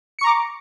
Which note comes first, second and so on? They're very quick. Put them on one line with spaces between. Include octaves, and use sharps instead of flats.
C#7 C#6 A#5 D6